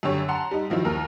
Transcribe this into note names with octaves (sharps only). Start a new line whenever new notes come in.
F#2 D3 G4 C#5
F#5 A5 A#5 C6
G3 D#4
D#3 F3 F#3 E4
D#2 A#4 F6